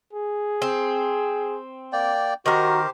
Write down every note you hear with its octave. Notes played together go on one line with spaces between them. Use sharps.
G#4
C4
A#3 D5 G5
D#3 F#4 G4 A#4 C5